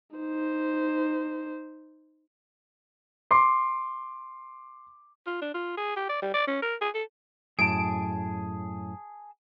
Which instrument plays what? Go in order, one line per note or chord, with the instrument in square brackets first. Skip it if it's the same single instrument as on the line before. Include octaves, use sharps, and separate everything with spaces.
[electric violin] D#4 C5
[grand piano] C6 D6 C7
[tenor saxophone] F4
D4
F4
G#4
G4
D5
G3
D5
C#4
A#4
G#4
A4
[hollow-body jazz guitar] F#2 A2 [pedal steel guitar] G#4 A5 [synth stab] D7